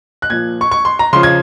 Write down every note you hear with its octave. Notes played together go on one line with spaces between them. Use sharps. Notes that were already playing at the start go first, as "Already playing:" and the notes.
F#6
A#2 F3 G#6
C#6
C#6
C6
A#5
C#3 F3 C6
G#6